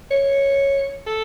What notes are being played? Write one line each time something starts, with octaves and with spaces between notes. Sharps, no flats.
C#5
A4